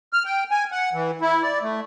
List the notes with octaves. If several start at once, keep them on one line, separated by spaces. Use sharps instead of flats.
F6
G5
G#5
F#5
E3
E4
D5
A3